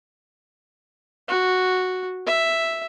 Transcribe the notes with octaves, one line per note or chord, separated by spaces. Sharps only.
F#4
E5